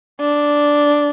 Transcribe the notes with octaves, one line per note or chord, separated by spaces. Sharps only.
D4